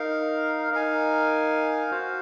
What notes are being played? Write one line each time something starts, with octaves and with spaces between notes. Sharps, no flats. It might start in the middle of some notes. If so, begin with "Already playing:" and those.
Already playing: D#4 A#4 F5
D#4 A#4 F5 G#5
F#4 C5 F5